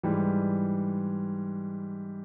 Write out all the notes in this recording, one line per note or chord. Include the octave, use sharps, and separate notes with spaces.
G#2 E3 G3